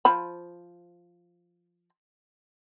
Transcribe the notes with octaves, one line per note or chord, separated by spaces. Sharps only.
F3 C5 B5